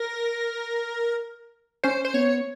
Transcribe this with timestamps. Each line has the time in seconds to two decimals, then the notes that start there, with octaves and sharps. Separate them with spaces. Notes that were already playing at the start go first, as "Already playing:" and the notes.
Already playing: A#4
1.84 C#4 C5
2.05 C5
2.14 B3 C#5